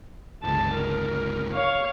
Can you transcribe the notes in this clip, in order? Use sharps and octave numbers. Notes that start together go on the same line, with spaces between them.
G1 C#2 A5
A#4
C#5 F5